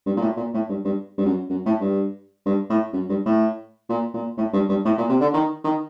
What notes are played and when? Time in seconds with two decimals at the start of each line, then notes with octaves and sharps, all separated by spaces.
0.06 G2
0.16 A#2
0.21 A2
0.37 A#2
0.54 A2
0.69 G2
0.85 G2
1.18 G2
1.25 F#2
1.49 F#2
1.66 A2
1.81 G2
2.46 G2
2.70 A2
2.93 F#2
3.09 G2
3.26 A2
3.89 A#2
4.14 A#2
4.37 A2
4.53 G2
4.69 G2
4.85 A2
4.97 A#2
5.09 C3
5.21 D3
5.34 D#3
5.64 D#3